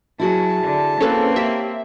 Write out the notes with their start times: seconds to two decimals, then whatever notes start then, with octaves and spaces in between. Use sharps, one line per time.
0.20 F#3 E4 F#4 G#4 A5
0.64 D3
1.01 A#3 C4 C#4 A4 B4
1.36 G4 C#5 E5 G5